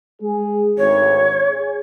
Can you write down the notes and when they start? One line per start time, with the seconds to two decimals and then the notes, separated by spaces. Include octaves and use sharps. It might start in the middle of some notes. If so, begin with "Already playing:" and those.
0.21 G#3 G#4
0.78 G#1 D2 C#5
1.51 G#4